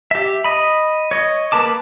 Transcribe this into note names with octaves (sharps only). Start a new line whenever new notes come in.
G4 E5
D#5 B5
C#5 D#5
A#3 A#4 B4 A5 D6